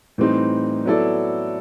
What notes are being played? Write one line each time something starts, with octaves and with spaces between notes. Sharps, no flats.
A2 E3 G3 C4 D#4
F#3 B3 E4 A4 D5